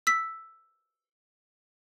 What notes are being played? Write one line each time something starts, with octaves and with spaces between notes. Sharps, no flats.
E6 B6